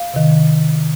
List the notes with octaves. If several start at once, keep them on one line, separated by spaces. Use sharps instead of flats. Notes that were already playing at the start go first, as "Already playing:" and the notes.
Already playing: F5
C3 D#3